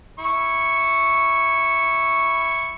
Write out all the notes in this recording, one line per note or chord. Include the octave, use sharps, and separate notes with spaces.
E4 C#6